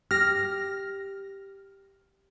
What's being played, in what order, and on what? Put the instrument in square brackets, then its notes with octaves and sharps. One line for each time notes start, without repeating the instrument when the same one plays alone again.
[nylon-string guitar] G4 [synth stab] F6 A#6